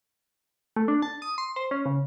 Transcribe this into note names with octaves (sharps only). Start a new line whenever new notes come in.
A3
D4
A5
D#6
C6
C5
C#4
C#3